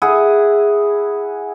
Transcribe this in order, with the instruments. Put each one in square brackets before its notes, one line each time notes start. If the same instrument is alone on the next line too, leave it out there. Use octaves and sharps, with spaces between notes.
[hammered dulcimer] E4 G#4 F#5